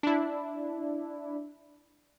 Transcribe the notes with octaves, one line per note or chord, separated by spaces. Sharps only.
D4 E4